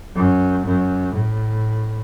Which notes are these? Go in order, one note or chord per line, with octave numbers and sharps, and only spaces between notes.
F#2
F#2
A2